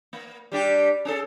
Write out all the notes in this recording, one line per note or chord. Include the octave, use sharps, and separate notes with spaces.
A#3
G3 D4 G4
C#4 G#4 A4